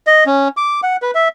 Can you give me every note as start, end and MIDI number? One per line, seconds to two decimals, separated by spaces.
0.07 0.24 75
0.26 0.48 61
0.57 0.81 86
0.83 0.96 78
1.02 1.11 71
1.15 1.28 76